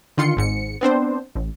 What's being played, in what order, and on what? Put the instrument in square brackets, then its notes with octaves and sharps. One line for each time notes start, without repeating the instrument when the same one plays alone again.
[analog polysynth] D3 D#3 F4 C6 C#7
G#1 G#2 C#7
B3 C4 D4 C5
A1